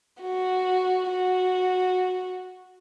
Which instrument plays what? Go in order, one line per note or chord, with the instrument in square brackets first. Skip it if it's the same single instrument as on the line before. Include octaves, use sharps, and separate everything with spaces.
[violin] F#4
F#4